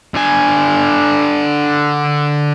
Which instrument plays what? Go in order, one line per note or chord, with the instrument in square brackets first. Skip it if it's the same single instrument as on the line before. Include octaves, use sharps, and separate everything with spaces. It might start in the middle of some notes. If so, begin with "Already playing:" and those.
[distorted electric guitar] D3 G#5